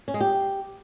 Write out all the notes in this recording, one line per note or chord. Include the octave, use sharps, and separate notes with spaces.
C#4
G#3
G4